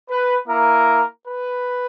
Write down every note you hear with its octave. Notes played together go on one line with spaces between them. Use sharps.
B4
A#3 E4 A#4
B4